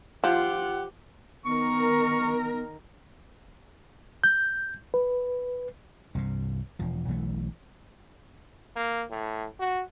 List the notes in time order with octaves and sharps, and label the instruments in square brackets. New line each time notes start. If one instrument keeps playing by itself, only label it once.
[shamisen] F3 [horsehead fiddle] F4 F#5 [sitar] G4
[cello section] D#3 A#4 [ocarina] B3 [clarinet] C#6
[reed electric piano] G6
B4
[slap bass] C2 G2 C3
E1 F3
B1 E3 A3
[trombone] A#3
A2
F#4